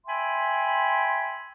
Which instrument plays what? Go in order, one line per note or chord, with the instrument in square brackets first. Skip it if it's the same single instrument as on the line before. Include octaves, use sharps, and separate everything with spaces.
[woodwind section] E5 G5 G#5 B5 C6